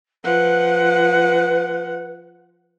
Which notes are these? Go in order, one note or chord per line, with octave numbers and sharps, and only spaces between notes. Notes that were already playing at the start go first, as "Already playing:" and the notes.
F3 B4 F#5